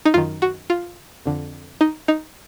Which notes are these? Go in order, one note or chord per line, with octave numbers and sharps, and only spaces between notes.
D#4
F#2 D#3 F4
F#4
F4
F2 D3
D#4
D#4